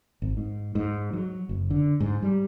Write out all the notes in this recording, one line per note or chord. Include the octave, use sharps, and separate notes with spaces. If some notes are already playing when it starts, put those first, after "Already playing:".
G#1
G#2
G#2
F#3
F#1
D3
G#2
G3